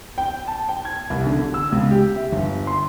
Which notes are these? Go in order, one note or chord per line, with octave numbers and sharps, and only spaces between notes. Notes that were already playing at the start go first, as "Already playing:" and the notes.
G5
A5
G5
G#6
C2
D3
E6
C#2
G4
E5
G1
C6